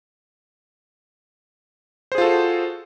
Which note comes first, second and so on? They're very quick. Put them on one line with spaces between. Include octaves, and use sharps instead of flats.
C5 G#4 F4 A4 F#4